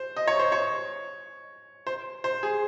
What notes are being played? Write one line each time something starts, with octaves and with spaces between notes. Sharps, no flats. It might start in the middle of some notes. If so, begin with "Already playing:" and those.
Already playing: C5
D#5
C#5
C5
C#5
C5
C5
G#4